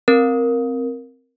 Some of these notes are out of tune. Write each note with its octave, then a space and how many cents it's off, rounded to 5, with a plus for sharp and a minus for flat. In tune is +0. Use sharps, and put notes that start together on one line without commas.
C4 +0 A#4 +0